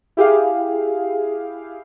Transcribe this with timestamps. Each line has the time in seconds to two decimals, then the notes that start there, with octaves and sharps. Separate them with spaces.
0.17 E4 G4 G#4 F5